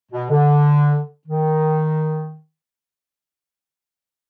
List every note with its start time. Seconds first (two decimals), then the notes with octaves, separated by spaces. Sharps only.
0.12 B2
0.30 D3
1.28 D#3